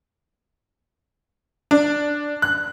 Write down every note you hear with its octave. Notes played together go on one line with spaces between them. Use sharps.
D4
F#6